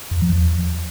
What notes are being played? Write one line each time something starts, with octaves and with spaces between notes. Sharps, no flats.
F2
F3
E2